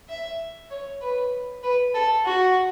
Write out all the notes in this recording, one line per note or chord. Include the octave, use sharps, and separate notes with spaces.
E5
C#5
B4
B4
A4
F#4